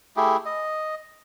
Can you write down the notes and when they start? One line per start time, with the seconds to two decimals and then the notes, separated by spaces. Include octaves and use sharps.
0.16 A3 E4 G4 G#4
0.46 D#5